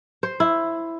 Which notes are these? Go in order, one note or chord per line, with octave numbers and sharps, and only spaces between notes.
C5
E4